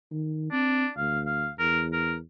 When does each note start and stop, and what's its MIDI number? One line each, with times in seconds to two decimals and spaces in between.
0.12 0.49 51
0.52 0.85 60
0.52 0.90 62
0.97 1.51 38
0.97 1.19 77
1.26 1.49 77
1.59 2.21 40
1.59 1.83 70
1.93 2.14 70